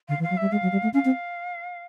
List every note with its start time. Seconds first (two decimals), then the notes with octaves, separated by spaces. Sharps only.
0.09 D3 F5
0.19 E3
0.23 F5
0.30 F#3
0.37 G3 E5
0.51 G#3 F5
0.63 F#3
0.72 G3
0.83 A3
0.94 C#4 F5
1.05 C4